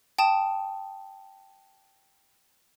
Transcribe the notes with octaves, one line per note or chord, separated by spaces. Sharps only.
G5 A5 D#6 E7